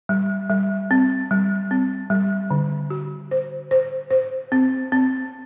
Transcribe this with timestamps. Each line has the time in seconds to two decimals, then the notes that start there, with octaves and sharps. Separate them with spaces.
0.09 G3
0.50 G3
0.91 C4
1.31 G3
1.71 C4
2.10 G3
2.51 D3
2.90 F#4
3.31 C5
3.71 C5
4.10 C5
4.52 C4
4.92 C4